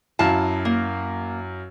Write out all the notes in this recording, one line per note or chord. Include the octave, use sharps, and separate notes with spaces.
F#2 E4 F5 A5
A#3